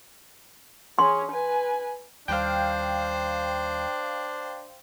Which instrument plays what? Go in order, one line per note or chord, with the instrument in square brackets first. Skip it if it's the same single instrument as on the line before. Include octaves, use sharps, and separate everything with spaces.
[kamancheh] C#4 G#4 [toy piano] C6
[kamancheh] B4 G#5
[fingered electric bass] D#2 G3 [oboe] D4 [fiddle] C5 [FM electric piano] F5 G5